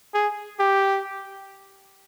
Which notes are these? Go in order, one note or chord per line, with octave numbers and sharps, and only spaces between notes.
G#4
G4